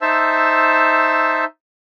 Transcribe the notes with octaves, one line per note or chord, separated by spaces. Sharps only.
D#4 C5 E5 A5 E6